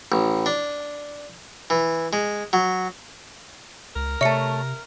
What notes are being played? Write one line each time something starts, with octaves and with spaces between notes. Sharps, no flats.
A1
D4
E3
G#3
F#3
C#2 A#4
C3 A3 C#5 E5 C#7